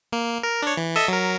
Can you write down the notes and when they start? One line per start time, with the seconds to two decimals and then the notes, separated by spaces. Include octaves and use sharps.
0.13 A#3
0.43 A#4
0.62 D4 C#5
0.77 E3
0.96 A4 D#5 E5
1.08 F#3 A#4